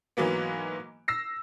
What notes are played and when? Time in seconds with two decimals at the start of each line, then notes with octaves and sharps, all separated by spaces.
0.17 G#2 E3 F#3 A#3 B3
1.08 E6 A#6 C7